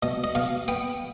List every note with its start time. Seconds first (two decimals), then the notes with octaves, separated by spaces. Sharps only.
0.03 B2 D#5
0.24 D#5
0.35 B2 F5
0.68 B3 G5